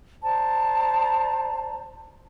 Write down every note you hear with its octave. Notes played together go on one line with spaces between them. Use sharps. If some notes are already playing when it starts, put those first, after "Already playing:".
C5 D5 A5 A#5